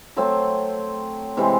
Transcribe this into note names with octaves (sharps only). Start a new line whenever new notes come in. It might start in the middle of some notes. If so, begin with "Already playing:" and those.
F#3 A3 C4
C3 E3 G#3 C4